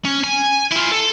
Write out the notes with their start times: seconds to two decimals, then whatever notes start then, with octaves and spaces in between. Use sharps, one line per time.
0.05 C#4
0.24 G#5
0.71 E4 F4
0.91 A4